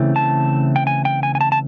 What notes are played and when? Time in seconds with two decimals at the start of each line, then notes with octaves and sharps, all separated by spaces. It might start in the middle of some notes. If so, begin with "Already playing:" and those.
Already playing: C#3 E3 A3 C4 E4
0.16 A5
0.76 G5
0.87 G#5
1.05 G5
1.23 G#5
1.35 G#5
1.41 A5
1.52 A5